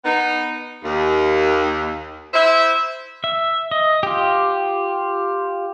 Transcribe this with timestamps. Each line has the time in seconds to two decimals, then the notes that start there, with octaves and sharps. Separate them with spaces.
0.05 B3 D#4
0.84 D#2
2.34 E4 C5 E5
3.24 E5
3.71 D#5
4.03 F4 G4